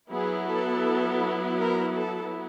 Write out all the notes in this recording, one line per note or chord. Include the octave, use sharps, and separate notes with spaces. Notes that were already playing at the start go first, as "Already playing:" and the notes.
F#3 B3 E4 G#4
A4
A#4
A4